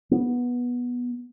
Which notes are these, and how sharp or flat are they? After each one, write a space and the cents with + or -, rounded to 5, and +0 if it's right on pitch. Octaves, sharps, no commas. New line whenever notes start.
B3 -15